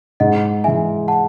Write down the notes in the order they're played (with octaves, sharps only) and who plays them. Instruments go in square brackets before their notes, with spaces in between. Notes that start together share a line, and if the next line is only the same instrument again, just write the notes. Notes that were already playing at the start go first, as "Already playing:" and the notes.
[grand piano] G#2 [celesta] D#5 F#5
[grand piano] E3 G#3 [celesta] E5 G#5
[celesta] F#5 A5